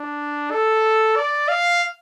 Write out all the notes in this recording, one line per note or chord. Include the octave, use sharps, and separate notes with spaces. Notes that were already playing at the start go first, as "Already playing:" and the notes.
Already playing: D4
A4
D5
F5